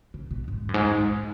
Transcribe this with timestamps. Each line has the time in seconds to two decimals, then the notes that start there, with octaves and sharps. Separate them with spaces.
0.14 C#3
0.31 B2
0.48 G#2
0.69 F#2
0.74 G#2
1.00 G#2